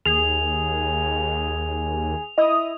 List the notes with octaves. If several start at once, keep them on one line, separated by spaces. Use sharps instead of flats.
D#2 G#4 F7
E4 D#5 D#6